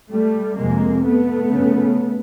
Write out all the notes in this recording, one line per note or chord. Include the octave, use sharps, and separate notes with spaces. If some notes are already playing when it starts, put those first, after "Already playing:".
G3 A3
F2 C3 G#3 A#3
A3 B3
F#2 C#3